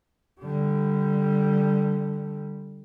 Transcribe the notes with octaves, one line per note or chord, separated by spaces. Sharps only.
D3 G3